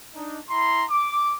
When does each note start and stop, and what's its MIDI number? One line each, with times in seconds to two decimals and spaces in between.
0.15 0.39 62
0.15 0.39 63
0.50 0.85 64
0.50 0.85 82
0.50 0.85 84
0.90 1.38 86